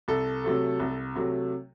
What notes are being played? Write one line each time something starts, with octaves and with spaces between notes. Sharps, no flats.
C2 A4
C3 F#3 A3
C2
C3 F#3 A3